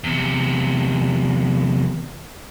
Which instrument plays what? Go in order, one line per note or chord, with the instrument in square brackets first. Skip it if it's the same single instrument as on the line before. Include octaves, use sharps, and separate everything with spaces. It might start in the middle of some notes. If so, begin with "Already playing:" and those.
[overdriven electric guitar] E2 C3